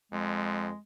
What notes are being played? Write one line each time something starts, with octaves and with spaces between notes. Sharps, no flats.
F2 G#3